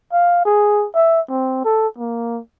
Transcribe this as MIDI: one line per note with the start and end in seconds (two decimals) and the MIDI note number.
0.13 0.41 77
0.45 0.86 68
0.95 1.21 76
1.29 1.61 60
1.64 1.87 69
1.98 2.40 58